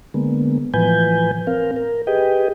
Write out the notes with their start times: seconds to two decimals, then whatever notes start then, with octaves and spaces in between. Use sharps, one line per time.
0.14 D3 G#3 A#3 B3
0.74 A2 E3 F3 B4 G#5 G6
1.47 C4 A#4 F5
1.76 A#4
2.07 G4 G#4 B4 D#5 G5